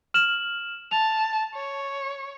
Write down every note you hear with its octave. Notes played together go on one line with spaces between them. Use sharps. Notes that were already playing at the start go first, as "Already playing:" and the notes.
F6 E7 F#7
A5 F7
C#5